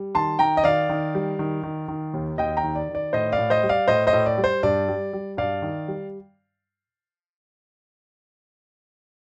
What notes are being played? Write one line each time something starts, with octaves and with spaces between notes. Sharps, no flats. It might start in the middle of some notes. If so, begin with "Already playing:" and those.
Already playing: G3
D#3 A5 C6
D#3 G5 A#5
D#5
D#3 D5 F5
D#3
G3
D#3
D#3
D#3
D#2
D#2 D#5 G5
G5 A#5
D#3
D5
D#3
D5
A2 C5 D#5
D5 F5
A2
C5 D#5
G3
D5 F5
A2 C5 D#5
C5 D#5
A2
D5
G3
C5
G2 D5
G3
G3
G2 D5 F5
D#3
G3